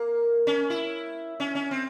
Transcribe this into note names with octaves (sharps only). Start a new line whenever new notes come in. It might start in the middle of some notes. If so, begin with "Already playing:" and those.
Already playing: A#3
C#4
E4
C#4
C#4
C4